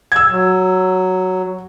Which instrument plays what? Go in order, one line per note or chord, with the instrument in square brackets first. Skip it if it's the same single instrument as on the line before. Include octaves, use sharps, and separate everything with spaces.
[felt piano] E6 G#6
[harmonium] F#3